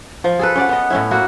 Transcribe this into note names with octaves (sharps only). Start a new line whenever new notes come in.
F3
G#4 A4 B4
C#4 D5 F#5
B3 D#5
A2 C#4 E4
A#3 E4 F#4